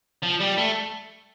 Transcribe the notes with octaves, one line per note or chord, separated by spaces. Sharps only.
F3
G3
A3